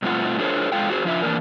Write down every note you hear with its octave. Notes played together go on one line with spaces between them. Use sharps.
G2 B2 A3 C4 F4 F#5
D4 F4 G#4 A#4 C5 C#5
G#3 F4 A4 F5 G5
F4 F#4 G#4 C5
F3 D4 F4 E5
E3 A#3 D4 A#4